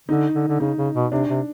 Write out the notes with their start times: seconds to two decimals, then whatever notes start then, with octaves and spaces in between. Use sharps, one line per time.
0.08 D3 D#4
0.35 D3
0.48 D3
0.60 C#3 D#4
0.77 C#3
0.95 B2
1.12 C3 D4
1.29 C3